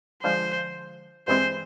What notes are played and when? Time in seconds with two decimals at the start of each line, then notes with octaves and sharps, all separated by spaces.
0.23 D3 F3 G#3 C5
1.27 G2 E3 G#3 C4 C5